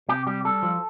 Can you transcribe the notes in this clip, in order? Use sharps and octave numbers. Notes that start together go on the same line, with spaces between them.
C3 G4
G3 G4
G3 A4
F3